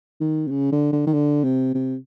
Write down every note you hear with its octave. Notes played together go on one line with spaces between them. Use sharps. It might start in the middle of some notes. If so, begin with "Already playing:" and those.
D#3
C3
C#3
D3
D3
D#3
D3
C3
C3